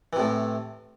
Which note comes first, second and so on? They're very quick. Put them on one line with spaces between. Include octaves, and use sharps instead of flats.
E3 C3 A2